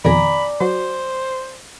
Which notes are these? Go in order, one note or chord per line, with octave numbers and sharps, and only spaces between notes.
F2 B2 D#3 D5 G#5 A#5 B5
F#3 F#4 C5